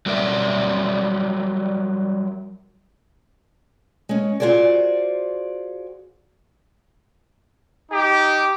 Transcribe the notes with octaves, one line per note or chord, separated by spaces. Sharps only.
F#3 G3 A#4 D5 E5
G#3 C#4
F4 F#4 G#4 C5 D5
D#4 G4